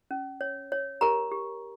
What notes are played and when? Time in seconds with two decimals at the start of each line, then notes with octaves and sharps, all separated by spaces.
0.11 C#4
0.41 C#5
0.72 C#5
1.01 G4 A#4 A#5
1.32 G4